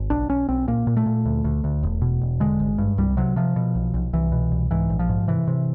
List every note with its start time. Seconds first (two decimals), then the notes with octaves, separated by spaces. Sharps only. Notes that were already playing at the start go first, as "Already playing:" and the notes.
Already playing: G#1
0.10 B1 D4
0.29 B1 C#4
0.49 B1 C4
0.67 A#2 A#3
0.87 A#2
0.97 A3
1.06 A#2
1.25 D2
1.44 D2
1.64 D2
1.83 E1
2.02 B2
2.22 E1
2.40 D3 G#3
2.60 G#1
2.78 G2
2.98 C2 G3
3.17 C3 F#3
3.36 C3 F3
3.56 B2
3.75 B1
3.94 B1
4.13 C2 E3
4.32 B2
4.51 C2
4.71 G#2 E3
4.90 A#1
4.99 F3
5.09 G#2
5.28 C3 E3
5.47 C3